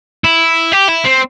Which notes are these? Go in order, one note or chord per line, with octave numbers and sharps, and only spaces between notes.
E4
G4
E4
C4